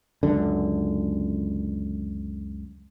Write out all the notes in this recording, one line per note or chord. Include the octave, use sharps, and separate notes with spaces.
C#2 F#2 D3